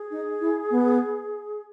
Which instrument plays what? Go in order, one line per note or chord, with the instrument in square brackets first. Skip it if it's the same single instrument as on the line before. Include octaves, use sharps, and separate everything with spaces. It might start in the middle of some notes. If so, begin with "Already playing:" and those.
Already playing: [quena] G#4
[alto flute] D#4
E4
B3